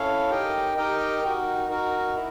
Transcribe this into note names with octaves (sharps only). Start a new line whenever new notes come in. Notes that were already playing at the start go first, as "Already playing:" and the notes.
Already playing: C#4 E4 A4 C#5 F5
D#4 G4 A#4 D#5 G5
D#4 G4 A#4 D#5 G5
D#4 F#4 A#4
D#4 F#4 A#4
E4